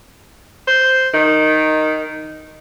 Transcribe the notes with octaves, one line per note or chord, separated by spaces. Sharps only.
C5
D#3